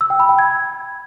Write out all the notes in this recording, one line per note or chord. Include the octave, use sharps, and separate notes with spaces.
E6
G5
B5
G5
G#6